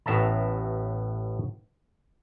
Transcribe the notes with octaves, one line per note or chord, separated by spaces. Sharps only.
A1 A2 B3 E5 A5 A#5